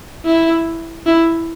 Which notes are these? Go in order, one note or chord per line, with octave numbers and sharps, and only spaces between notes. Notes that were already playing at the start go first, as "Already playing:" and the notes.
E4
E4